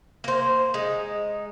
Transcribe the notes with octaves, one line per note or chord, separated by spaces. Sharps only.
A#3 C5
G#3 D#4